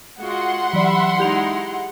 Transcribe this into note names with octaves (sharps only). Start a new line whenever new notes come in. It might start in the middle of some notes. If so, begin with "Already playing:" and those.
G#3 F4 F#4 F#5 C6
E3 F#3 G3 D5 E5 B5
G#3 D#4 E4 G4 F7